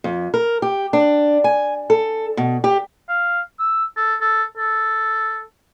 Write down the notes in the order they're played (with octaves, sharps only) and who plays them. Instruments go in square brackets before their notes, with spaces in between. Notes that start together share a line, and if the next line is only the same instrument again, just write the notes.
[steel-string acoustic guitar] F2
A#4
G4
D4
G#5
A4
B2
G4
[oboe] F5
E6
A4
A4
A4